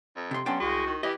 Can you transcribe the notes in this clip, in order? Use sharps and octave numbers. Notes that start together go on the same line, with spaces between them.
F2
C3 C6
G2 F#3 B3 C#4 G5 A5 C6
C2 G#3 F#4
D#3
E3 G4 D#5